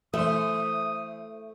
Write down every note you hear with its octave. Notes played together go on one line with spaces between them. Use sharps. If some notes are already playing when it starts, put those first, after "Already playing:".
E3 A3 C5 E5 D#6